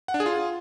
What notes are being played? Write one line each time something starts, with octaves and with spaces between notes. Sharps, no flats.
F#5
D4
G#4
F4